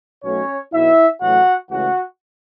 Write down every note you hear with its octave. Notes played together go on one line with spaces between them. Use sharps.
B1 B2 F#3 A3 C#4 C#5
B1 B2 F#3 E4 E5
A1 A2 F#3 A3 F#4 F#5
C#2 C#3 E3 A3 F#4 F#5